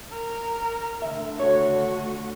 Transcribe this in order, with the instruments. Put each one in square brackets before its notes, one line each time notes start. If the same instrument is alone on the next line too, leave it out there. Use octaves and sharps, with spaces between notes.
[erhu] A#4
[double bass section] D3 A3 [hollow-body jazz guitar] E5
[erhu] F#4 [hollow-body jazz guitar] C#5